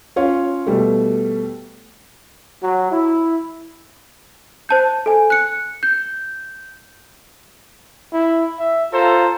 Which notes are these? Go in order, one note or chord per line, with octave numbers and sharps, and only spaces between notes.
C#4 F4 C#5
B2 G3 A3
F#3
E4
C5 A5 G6
A4 G#5
F#6 C#7
G6
E4
E5
F4 A4 C5 A#5